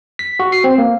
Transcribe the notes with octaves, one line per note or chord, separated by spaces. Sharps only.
B6
F#4
C7
C4
A#3